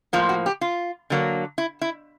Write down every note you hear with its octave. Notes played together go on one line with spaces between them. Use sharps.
A2 F3 A#3 F4
F#4
G4
F4
D3 F#3 A#3
E4
E4